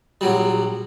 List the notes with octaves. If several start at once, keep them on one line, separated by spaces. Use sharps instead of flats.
A#1 F#3 G3